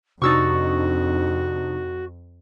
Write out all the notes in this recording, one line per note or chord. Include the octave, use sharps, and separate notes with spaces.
F2 C3 D4 D#4 F#4 C#6 E6 A6